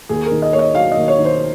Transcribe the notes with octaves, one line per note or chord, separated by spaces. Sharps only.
D#2 G#4
A#4
D#3
D#5
A#3 C#5
D#5
F#3 F5
D#5
D#2
C#5
D#3
C5